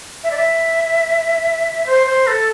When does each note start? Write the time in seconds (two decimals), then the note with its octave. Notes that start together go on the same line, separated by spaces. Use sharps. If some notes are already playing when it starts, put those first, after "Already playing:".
0.23 E5
0.30 D5
0.37 E5
1.86 C5
2.06 C5
2.26 A4